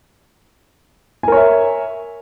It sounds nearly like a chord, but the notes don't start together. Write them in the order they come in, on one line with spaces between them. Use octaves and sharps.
G#5 A#4 C#5 E5